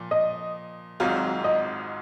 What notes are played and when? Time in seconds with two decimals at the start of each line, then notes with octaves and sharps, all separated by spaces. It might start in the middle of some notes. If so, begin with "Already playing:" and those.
Already playing: A#2 F3
0.11 D#5
1.00 G#1 G#2 F#3 C4 F4
1.44 D#5